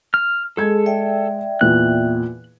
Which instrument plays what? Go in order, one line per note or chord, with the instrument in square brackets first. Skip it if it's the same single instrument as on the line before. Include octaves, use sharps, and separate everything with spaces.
[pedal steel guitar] F6
[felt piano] G#3 G#6 [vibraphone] G#4 [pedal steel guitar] A4
[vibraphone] D5 E5 G5
[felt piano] E2 A#2 [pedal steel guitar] F#6